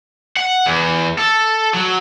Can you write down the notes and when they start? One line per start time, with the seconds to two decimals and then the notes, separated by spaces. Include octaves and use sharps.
0.37 F#5
0.66 E2
1.18 A4
1.74 F#3